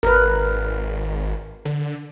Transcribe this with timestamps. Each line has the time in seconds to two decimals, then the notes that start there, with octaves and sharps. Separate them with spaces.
0.03 G#1 A#4 B4
1.65 D3